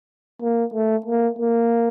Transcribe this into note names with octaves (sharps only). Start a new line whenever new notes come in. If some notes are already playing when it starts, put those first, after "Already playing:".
A#3
A3
A#3
A#3